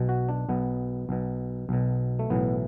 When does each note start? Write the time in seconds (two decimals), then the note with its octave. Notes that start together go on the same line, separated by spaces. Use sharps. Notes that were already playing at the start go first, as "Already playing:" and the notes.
Already playing: B1 B2
0.09 F#4
0.29 D4
0.49 B1 B2 B3
1.09 B1 B2
1.69 B1 B2
2.19 A3
2.30 B1 A2 E3 B3